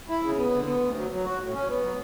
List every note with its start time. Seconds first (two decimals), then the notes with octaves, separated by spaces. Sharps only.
0.09 E4
0.23 C#3
0.37 B3
0.53 D3
0.67 B3
0.82 D2
0.96 F#3
1.11 F#3
1.25 F#4
1.40 A2
1.54 C#4
1.68 B3
1.83 F#3